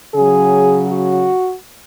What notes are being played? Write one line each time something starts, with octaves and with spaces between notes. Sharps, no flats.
C#3 F#3 G#4
F#4